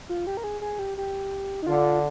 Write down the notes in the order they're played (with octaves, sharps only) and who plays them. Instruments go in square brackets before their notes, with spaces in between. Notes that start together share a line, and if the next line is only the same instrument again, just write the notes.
[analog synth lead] F4
G4
A#4
G#4
G#4
G4
G4
D#4
[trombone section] D3 [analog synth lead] F4